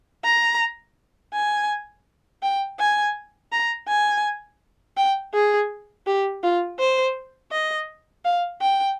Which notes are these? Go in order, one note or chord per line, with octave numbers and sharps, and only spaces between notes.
A#5
G#5
G5
G#5
A#5
G#5
G5
G#4
G4
F4
C5
D#5
F5
G5